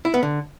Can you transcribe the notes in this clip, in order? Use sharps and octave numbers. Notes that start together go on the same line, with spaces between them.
E4
B3
D3